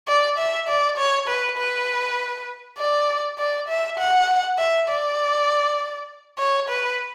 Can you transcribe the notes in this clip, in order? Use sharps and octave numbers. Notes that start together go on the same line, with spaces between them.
D5
E5
D5
C#5
B4
B4
D5
D5
E5
F#5
E5
D5
C#5
B4